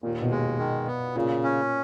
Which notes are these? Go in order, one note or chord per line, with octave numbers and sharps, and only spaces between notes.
D#2 A#2
B2
G#3
D#3
B3
A#2 C#3
C#4